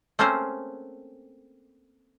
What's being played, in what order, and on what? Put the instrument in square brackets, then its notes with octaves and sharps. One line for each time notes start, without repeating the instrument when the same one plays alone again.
[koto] A3 A#3 C4 C#4 G#4 C5